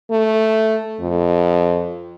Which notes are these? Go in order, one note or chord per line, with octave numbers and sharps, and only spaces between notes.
A3
F2